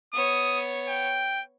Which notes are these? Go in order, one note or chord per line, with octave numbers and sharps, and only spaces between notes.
B3 C#5 D#6
G5